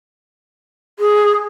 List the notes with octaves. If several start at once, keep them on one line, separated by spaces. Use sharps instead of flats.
G#4